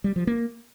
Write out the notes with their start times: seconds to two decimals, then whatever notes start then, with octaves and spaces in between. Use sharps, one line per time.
0.04 G3
0.16 F3
0.27 A#3